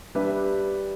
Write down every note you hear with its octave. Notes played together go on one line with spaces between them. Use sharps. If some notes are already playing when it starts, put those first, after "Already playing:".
G3 D4 G4 B4 E5